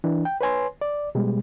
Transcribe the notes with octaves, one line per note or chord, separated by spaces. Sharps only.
E3 D4
G5
B4 C#5 G#5 C6
D5
B2 G3 G#3